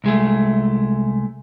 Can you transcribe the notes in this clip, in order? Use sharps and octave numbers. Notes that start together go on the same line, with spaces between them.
C2 G#3 A3